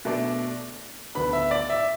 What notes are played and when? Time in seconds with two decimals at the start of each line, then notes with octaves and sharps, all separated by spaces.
0.05 B2 A3 D4
1.15 D2 D3 B3 D4 B5
1.33 E5
1.51 D5
1.70 E5